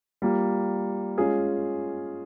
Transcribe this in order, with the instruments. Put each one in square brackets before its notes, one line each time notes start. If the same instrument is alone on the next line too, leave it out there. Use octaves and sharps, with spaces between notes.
[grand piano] G3 A#3 F4
G#3 C#4 F4 G#4